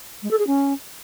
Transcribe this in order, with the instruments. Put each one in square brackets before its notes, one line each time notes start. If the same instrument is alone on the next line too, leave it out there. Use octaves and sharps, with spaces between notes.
[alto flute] G#3
A4
G#4
C#4